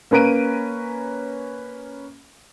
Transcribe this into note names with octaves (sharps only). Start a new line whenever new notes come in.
A#3 C#4 B4 A#5 D7 D#7